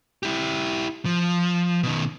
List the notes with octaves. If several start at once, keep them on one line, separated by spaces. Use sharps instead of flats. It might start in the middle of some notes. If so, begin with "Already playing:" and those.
E4 G4
F3
B2 D#3